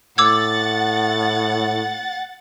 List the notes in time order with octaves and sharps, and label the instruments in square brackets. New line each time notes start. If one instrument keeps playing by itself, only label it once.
[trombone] A2 [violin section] F#5 A6 [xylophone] D6 E6 G#6